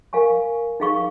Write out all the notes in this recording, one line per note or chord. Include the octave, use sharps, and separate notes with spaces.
A#4 F5 G#5 C#6
D#4 G#4 F5 C#6